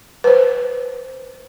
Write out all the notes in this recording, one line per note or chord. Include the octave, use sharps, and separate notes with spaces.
B4 C5